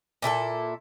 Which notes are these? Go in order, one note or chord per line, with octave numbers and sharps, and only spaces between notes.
A#2 E4 G#4 A4